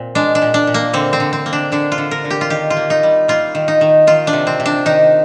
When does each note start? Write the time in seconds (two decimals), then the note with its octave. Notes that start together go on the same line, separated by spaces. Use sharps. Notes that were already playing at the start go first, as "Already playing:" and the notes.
Already playing: A#2 C4
0.15 G#3 D4
0.35 D4
0.42 A#2
0.54 D4
0.67 A#2
0.74 A#3
0.93 D3 C4
1.13 C4
1.20 D3
1.33 C4
1.46 A#3
1.53 D4
1.72 D3 D4
1.92 F4
1.98 D3
2.11 A#4
2.25 D3
2.30 G4
2.41 F4
2.50 D#3 G4
2.70 F4
2.77 A#3
2.90 D#4
3.03 G3
3.28 A#3 F4
3.55 D#3
3.68 D#4
3.81 D#3
4.07 D#3 F4
4.27 D4
4.33 C3
4.47 C4
4.60 C3
4.66 D4
4.86 D#3 D#4